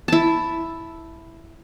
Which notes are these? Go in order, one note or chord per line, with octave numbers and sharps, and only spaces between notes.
E4 A5